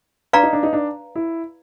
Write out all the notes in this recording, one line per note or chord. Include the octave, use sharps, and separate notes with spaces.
D4 B4 D5 F5 A#5
D#4
D4
D#4
D4
E4